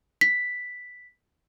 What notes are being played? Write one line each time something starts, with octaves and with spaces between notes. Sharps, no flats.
B6